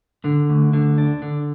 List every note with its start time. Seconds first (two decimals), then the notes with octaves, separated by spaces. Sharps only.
0.24 D3
0.49 D2
0.73 D3
0.98 D4
1.22 D3